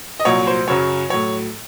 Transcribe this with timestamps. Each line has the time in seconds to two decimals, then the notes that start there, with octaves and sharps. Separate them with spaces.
0.20 D#5
0.25 C2 A#2 F#3 C#5
0.47 C5
0.68 F#2 C#3 F#3 C#5
1.10 A2 F#3 C#5